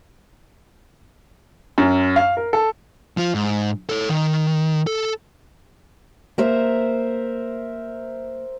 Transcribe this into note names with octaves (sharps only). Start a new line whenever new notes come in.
F#2
F5
A#4
A4
F3 F4
G#2
A4 C#5
D#3
A4
A#3 A#4 C5 E5